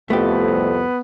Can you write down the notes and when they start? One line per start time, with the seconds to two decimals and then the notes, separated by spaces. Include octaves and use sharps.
0.10 C2 F2 A3 B3 G4